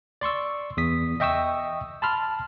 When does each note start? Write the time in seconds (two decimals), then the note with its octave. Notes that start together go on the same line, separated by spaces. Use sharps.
0.21 D5 C6 C#6 E6
0.77 E2 D#6 B6
1.20 D#5 E5 G5 C#6 D#6 E6
2.02 A5 B5 C6 F6